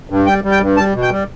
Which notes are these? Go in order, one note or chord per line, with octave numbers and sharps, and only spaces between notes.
G2
G3 G5
G3
G5
G2
G3 A5
B2
G5
G3